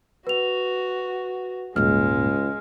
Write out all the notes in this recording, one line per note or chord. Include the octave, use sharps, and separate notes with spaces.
F#4 B4 F7
D#1 C#2 G#2 G#3 F6